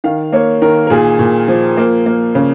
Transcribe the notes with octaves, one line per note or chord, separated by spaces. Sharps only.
D#3 F5
A#3 C#5
D#3 A#4
A#4
A#2 G#4
A#2
F3
A#3
A#3
C#3